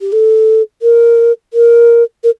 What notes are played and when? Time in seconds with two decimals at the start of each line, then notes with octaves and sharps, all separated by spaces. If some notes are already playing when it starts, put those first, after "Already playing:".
0.01 G4
0.12 A4
0.82 A#4
1.53 A#4
2.23 A#4